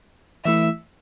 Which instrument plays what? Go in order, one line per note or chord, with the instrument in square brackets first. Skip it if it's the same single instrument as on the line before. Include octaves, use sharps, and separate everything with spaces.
[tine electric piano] E3 A3 E4 [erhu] E5